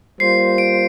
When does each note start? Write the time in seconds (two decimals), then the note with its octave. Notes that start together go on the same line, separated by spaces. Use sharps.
0.20 G3 A#3 F4 C5 C7
0.58 D7